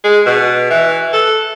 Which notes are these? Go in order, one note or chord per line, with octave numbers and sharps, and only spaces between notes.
G#3
B2
E3
A4